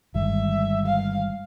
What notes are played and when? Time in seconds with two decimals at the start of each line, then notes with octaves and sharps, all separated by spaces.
0.14 G1 G2 D#3 G#3 E5
0.86 F5